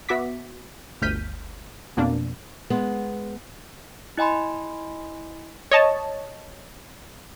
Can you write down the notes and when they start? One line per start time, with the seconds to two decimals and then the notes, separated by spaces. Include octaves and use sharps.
0.09 B3 F#4 E5 D6 B6
1.02 G1 D2 F6 G6 B6 D#7
1.97 F2 B2 A#3 D4
2.70 G#3 B3
4.18 E4 D#5 G#5 B5 C6
5.71 C#5 D#5 A5